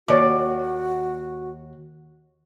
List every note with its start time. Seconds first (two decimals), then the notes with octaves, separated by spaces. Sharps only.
0.08 D#2 F#4 C#5 D5 D6